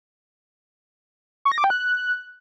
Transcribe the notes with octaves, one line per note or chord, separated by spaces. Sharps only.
C#6
A#6
D6
G5
F#6